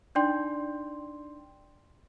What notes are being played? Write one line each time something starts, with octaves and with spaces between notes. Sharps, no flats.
D4 D#4 D5 G5 C6 G6